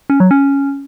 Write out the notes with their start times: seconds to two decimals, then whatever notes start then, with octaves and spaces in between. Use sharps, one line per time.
0.10 C#4
0.20 F#3
0.31 C#4